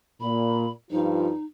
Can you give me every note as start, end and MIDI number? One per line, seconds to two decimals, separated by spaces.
0.21 0.65 46
0.21 0.70 83
0.91 1.29 43
0.91 1.29 53
0.91 1.44 63
0.91 1.29 65